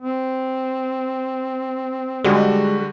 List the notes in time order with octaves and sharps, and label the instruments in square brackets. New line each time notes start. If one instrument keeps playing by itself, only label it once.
[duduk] C4
[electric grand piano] D3 G3 F#4 [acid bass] G#3